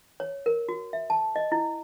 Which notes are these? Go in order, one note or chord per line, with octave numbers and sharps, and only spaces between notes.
C#5
A#4
F#4
E5
A5
D#5
E4